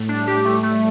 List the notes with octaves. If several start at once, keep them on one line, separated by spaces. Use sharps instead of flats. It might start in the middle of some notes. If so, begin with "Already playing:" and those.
Already playing: A2 A3
G3 D4
G4
A3
A3